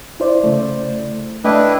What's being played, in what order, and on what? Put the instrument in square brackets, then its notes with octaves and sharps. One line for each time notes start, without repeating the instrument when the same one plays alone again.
[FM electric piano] E4 C5 D5
[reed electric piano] C#3 A3
[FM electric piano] A3 [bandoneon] D4 E4 B4 [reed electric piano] D#5 G5 D6